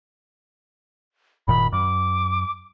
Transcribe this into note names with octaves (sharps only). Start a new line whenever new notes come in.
F#1 A#2 D#3 B5
F#2 D6